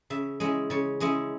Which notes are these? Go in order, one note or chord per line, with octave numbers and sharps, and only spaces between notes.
C#3 E5
G#3 C#4 E4 D#5
C#3 C#5
G#3 C#4 E4 D#5